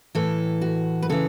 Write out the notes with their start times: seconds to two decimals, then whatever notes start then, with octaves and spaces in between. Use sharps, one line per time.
0.15 A2 E3 A4
0.61 F#4
1.02 B4
1.10 C#3 E3 A4